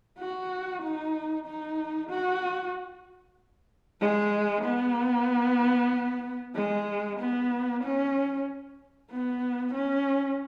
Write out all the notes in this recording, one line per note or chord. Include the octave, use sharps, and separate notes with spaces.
F#4
D#4
D#4
F#4
G#3
B3
G#3
B3
C#4
B3
C#4